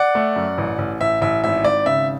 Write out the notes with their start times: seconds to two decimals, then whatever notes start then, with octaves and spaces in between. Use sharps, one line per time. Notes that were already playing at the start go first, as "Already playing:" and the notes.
Already playing: D5 F#5
0.15 A3
0.36 F#2
0.58 A1
0.78 A1
1.00 A1 E5
1.21 A1 E5
1.44 G#1 E5
1.64 G#1 D5
1.86 C#3 E5